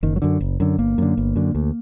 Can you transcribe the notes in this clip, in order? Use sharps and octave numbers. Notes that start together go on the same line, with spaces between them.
F#1 D#3
F#3
F#2 D3
F#1
F#2 D3
G1 A#3
F#2 D3
G1
F#2 D3
D2